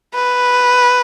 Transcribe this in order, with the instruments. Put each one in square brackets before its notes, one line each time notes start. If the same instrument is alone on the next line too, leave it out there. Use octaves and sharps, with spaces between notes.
[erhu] B4